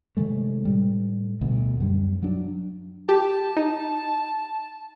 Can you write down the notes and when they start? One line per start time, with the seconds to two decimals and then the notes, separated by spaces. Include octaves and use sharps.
0.17 C3 D#3 G#3 A3
0.65 A2 G3
1.41 D2 B2
1.80 F#2 G3
2.23 F#3 D4
3.09 G4 A5
3.57 D#4